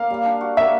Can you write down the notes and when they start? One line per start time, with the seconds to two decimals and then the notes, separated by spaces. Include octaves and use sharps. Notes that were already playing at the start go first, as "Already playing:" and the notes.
Already playing: A#3 F5
0.10 G3
0.25 D4
0.41 F#4
0.57 A#3 E5